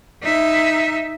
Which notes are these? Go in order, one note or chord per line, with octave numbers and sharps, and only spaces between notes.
D#4 E5